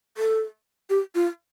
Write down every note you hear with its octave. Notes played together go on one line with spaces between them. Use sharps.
A4
G4
F4